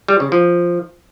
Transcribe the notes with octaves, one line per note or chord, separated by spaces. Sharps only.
G3
C#3
F3